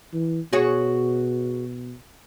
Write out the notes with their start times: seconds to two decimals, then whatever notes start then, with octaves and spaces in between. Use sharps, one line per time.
0.13 E3
0.53 B2 F#4 G#4 C#5